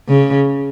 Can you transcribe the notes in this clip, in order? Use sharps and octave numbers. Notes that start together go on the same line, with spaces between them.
C#3